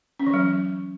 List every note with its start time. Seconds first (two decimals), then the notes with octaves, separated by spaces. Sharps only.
0.19 C#4
0.27 E3
0.34 F#3